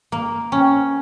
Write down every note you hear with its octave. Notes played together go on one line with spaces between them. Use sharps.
A#3
C#4